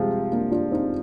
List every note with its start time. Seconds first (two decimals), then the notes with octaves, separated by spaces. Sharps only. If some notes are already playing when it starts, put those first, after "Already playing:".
Already playing: C3 F3 G3 G#3 C4 F4
0.32 A#3 D4
0.51 D4 F4
0.72 C4 D#4